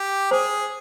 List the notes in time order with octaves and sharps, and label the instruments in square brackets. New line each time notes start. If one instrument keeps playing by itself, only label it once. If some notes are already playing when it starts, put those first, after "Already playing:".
Already playing: [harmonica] G4
[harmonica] G#4 [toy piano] C5